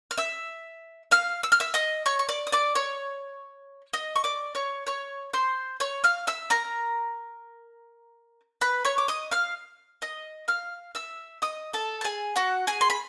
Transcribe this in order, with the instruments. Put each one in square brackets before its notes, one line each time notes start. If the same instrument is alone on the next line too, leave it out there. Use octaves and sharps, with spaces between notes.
[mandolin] F6
E5 E6
F5 F6
E6
F6
E5 E6
D#5 D#6
C#5 C#6
C#6
D5 D6
D#6
D5 D6
C#5 C#6
D#5 D#6
C#6
D5 D6
C#5 C#6
C#5 C#6
C5 C6
C#5 C#6
F5 F6
E5 E6
A#4 A#5
B4 B5
C#5 C#6
D6
D#5 D#6
F5 F6
D#5 D#6
F5 F6
E5 E6
D#5 D#6
A4 A5
A5
G#4 G#5
F#4 F#5
G#4 G#5
C6
B5